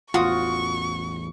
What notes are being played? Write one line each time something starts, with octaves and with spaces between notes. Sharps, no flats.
A1 E2 F4 F#4 C#6 D#6